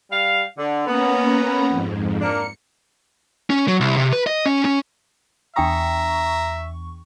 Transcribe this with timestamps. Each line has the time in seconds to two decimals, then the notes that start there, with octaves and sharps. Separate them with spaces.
0.11 G3 F5
0.58 D3
0.87 A#3 B3 C#4 A#5
1.70 F2 G#2
2.21 A#3 D4 A#4 C#7
3.50 C#4
3.68 F#3
3.80 C2
3.97 C3
4.13 B4
4.27 D#5
4.46 C#4
4.65 C#4
5.56 E2 D4 E5 G5 A#5 C#6 D#6